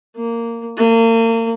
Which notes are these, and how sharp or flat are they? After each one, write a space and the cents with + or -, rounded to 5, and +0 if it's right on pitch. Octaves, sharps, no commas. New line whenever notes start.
A#3 -10
A#3 -40